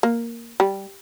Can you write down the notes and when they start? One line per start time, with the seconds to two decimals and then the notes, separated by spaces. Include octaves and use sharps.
0.03 A#3
0.60 G3